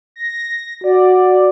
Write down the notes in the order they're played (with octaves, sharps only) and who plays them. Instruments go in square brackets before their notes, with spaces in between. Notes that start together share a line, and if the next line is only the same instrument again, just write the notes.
[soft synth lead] A#6
[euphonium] F#4 [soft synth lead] D5